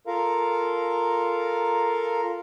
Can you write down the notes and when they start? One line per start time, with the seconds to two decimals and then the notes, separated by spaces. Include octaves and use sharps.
0.07 F4 A4 A#4 F5 A#5